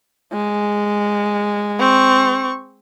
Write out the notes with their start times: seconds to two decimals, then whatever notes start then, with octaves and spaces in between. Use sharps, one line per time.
0.33 G#3
1.79 C4 C#6